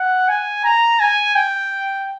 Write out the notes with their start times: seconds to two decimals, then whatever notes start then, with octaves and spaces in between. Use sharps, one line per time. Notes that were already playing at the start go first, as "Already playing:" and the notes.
Already playing: F#5
0.29 G#5
0.64 A#5
1.00 G#5
1.35 G5